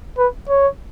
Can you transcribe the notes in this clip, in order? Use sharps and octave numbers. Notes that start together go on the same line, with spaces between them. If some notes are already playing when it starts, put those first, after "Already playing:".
B4
C#5